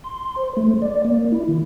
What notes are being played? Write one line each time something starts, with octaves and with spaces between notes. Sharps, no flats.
C6
C5
A3
D5
A#3
E4
D#3